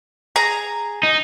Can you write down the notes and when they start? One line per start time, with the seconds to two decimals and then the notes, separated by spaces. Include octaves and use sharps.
0.36 G#4 A#5
1.03 D#4